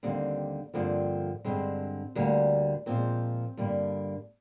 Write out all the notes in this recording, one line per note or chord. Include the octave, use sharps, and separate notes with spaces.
D#2 D3 G3 A#3 C4
G2 D3 F3 A#3 C4
G2 D3 G#3 C4
D2 D3 G3 A#3
A#2 F3 G#3 C4
G2 D3 G3 A#3